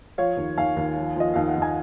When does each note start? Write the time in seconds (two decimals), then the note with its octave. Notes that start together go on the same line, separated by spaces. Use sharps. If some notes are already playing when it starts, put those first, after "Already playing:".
0.18 F3 C#5 F5
0.37 D#2
0.58 D#2 F5 G#5
0.77 D#2
0.97 F3
1.16 F3 D#5
1.34 D#2 F5
1.48 F#5
1.56 D#2
1.62 G#5